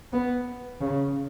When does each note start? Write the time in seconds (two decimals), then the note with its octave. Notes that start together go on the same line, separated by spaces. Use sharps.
0.13 B3
0.80 C#3